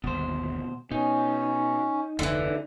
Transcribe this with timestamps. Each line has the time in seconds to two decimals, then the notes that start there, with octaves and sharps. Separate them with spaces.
0.04 G1 D#2 B2 C5
0.91 B2 C#4 D#4
2.19 F1 D2 D3 E3 D4